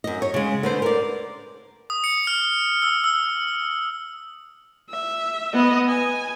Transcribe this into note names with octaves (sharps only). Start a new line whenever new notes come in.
F#2 D#5
C#5
C#3 G#3
D3 B4 C5
A#4 D5
D#6
C#7
F6
E6
E6
E5
B3 D#5
G#5